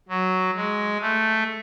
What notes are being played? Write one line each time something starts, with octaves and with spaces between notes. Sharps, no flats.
F#3
G#3
A3